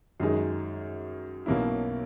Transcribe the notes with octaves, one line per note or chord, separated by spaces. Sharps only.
F#2 D#3 G#3 D#4 G#4
B1 B2 A#3 C#4 E4